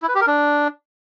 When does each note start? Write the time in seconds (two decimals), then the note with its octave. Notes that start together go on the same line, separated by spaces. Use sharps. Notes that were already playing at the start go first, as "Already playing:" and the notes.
0.02 E4
0.09 B4
0.15 G4
0.21 A#4
0.27 D4